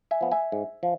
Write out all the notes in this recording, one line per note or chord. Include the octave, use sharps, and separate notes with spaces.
E5 G#5
F3 B3
E5 G#5
G#2
F3